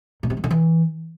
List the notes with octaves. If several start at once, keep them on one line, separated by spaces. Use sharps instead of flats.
A#2
C3
G2
D3
E3